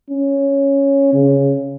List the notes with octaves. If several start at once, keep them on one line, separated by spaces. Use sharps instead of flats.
C#4
C#3